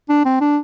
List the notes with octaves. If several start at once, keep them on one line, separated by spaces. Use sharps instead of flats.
D4
C4
D4